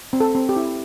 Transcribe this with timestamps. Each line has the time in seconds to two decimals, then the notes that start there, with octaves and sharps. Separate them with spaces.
0.13 C4
0.20 A4
0.35 C4
0.49 G4
0.56 E4